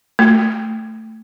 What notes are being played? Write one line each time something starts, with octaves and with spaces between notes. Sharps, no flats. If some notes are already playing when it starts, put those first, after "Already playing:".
A3